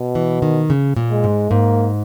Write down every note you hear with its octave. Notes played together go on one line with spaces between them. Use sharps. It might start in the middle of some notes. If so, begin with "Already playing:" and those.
Already playing: B2
E3
D#3
C#3
A#2
G#3
G#2
G#2 A#3